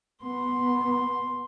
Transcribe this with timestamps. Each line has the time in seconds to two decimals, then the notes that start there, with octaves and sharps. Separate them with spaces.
0.22 B3 C6